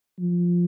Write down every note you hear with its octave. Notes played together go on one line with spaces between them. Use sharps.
F3